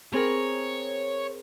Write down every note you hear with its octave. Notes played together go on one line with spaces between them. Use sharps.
C4 G#4 A#4 C#5